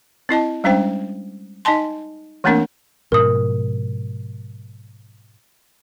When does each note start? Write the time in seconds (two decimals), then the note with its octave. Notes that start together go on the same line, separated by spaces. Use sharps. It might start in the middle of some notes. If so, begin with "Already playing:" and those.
0.29 C4 E4 D#5 A5
0.64 G3 G#3 C#4 D4 C5 G5
1.65 D#4 D#5 G#5 A5 C6
2.44 E3 A3 A#3 C4 D4 A#4
3.12 G#2 B2 F3 A#4 D#6